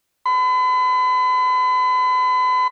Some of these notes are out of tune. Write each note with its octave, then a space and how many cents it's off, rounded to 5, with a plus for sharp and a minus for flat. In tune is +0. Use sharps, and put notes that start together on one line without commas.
B5 +40